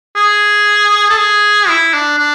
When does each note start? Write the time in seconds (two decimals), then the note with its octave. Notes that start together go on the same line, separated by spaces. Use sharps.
0.16 G#4
1.10 A4
1.18 G#4
1.68 E4
1.94 D4
2.19 D4